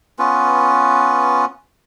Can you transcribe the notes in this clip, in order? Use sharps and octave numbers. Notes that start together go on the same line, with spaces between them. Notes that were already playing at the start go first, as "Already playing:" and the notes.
B3 C#4 F4 B4